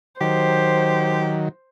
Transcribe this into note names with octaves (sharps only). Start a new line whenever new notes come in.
D#3 F#3 G4 C5